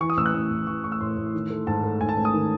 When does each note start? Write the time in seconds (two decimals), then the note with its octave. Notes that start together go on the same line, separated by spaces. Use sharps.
0.01 E3 C#6
0.10 D#6
0.17 A1 E6
0.26 F#6
0.34 A1 D#6
0.51 A1
0.67 E3 C#6
0.84 A2 C#6
0.92 E6
1.01 A2 C6
1.17 A2
1.34 D#3
1.50 A3
1.67 G#2 A5
1.84 A3
2.00 G#2 G#5
2.09 A5
2.17 A1
2.25 D#6
2.34 D#3